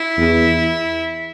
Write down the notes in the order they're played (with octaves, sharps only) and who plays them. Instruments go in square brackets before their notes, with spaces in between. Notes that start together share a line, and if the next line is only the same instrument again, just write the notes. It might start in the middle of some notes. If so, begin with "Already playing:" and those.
Already playing: [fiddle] E4
[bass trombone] E2